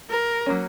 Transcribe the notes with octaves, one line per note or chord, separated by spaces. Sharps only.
A#4
F#3 A#3 C#4